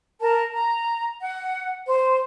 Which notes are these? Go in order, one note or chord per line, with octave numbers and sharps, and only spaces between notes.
A#4 A5
A#5
F#5
C5